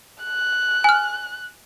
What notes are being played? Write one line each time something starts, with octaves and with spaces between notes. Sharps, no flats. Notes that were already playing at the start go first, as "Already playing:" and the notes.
F#6
G#5 F6